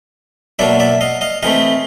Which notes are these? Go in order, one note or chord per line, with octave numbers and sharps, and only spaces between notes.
B2 F#3 A#3 D4 D5 E5
D5 E5
D#5 F5
D#5 F5
C3 E3 A3 C4 D#5 F5